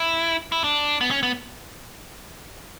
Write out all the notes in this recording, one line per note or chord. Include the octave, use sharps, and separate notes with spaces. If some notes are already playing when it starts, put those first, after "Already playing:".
Already playing: E4
E4
D4
B3
C#4
B3